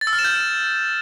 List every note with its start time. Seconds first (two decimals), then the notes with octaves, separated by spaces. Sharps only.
0.01 A6
0.07 E6
0.13 F6
0.19 E7
0.24 G6